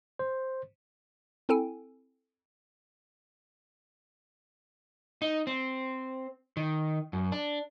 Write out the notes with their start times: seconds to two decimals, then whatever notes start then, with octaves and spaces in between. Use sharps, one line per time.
0.19 C5
1.49 C4 E4 A4 G5 G#5
5.22 D#4
5.47 C4
6.57 D#3
7.13 F#2
7.32 D4